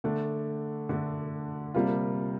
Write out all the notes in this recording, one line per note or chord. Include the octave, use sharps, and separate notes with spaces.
D3 A3 D4
D3 A3 D4
C3 G3 A#3 F4